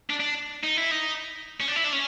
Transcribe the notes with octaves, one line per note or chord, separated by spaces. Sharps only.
D4
D4
D#4
E4
D#4
C#4
D4
E4
D4
C#4